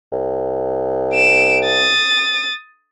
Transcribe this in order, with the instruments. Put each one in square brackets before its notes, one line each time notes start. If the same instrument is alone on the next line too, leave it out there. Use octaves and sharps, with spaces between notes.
[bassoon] C2
[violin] D7 E7
D#6 A6